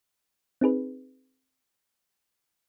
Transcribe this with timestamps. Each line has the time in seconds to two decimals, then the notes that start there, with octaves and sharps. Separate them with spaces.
0.61 C4 D#4 G#4 B4